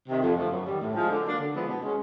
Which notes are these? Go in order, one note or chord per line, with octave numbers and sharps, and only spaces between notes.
C3 D#3
F2
D3 F3 A3
F#2
D#3 G3
A2
F3 G#3
D3
F#3 A#3 D4
D3
F3 G#3 B3 E4
B2
G#3 C#4